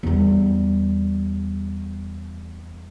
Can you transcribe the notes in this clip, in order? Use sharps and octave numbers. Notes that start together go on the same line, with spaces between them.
E2 G3